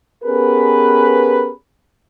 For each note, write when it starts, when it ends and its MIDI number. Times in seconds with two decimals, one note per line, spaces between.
0.24 1.51 59
0.24 1.51 61
0.24 1.51 67
0.24 1.51 68
0.24 1.51 70
0.24 1.51 71